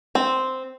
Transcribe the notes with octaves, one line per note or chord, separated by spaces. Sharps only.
C4